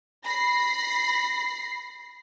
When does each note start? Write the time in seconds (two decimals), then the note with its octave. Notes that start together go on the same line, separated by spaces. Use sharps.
0.24 B5 A#6 C7